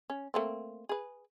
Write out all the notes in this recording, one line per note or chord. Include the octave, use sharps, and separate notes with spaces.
C#4
A3 A#3 C4
G#4 B4